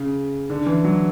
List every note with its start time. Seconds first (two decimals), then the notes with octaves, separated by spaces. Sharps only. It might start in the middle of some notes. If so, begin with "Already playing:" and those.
Already playing: C#3
0.50 D3
0.66 E3
0.85 F#3